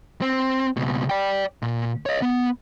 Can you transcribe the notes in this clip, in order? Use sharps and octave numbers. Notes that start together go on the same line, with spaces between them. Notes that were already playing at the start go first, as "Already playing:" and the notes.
C4
C#2 B2
D5 G5
A#2
C#5 D#5
B3